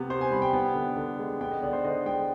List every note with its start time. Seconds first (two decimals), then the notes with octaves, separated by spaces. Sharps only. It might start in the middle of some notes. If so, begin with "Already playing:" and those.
Already playing: C3 B3
0.10 C3 C5
0.21 G#5
0.31 G3 B5
0.42 G5
0.53 B3
0.74 D3
0.96 D3
1.19 G#3
1.41 B3 G5
1.51 D#5
1.62 D3 D5
1.73 C5
1.84 D3 D#5
2.06 G#3 G5